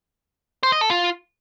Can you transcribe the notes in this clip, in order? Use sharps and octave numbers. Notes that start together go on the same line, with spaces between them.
C5
D#5
A4
F4